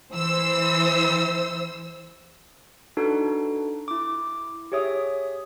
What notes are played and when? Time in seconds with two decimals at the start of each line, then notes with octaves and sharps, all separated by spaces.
0.14 E3 C5 E6
2.97 D4 D#4 F#4 A4 B4
3.88 E4 D6
4.72 G4 G#4 C#5 E5 D#6